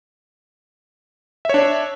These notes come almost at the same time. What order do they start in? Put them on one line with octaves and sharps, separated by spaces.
E5 C#5 D4